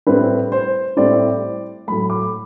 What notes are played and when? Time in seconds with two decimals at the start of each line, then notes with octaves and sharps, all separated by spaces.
0.07 A2 G3 C4 E4 B4
0.52 C5
0.97 A2 G3 C4 E4 D5
1.87 A2 F#3 A3 B5
2.10 D6